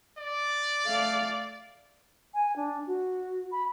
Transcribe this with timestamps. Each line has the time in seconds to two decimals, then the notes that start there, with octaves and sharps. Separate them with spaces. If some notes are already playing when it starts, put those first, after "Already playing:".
0.18 D5
0.86 A3 F5
2.34 G#5
2.56 D4
2.87 F#4
3.51 B5